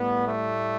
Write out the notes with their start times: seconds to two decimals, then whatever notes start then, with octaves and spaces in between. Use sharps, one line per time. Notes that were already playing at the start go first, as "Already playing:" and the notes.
Already playing: A2 G3 B3
0.27 A3